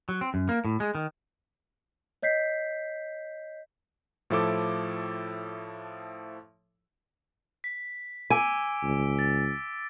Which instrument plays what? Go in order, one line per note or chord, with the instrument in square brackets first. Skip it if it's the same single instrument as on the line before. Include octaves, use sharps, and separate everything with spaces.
[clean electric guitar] F#3
C4
F#2
A#3
A2
G#3
D#3
[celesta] C#5 D#5 G6 B6 C7
[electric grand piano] A2 F3 E4 A4 D6
[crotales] B6
[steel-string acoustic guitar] G#5 [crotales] D6 E6 D7
[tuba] C#2
[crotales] A6